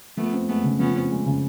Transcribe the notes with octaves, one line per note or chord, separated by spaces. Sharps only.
F3 A3 B3
C4
G#3 A3 B3
C#3
F3 B3 C#4
C4
G#3
C#3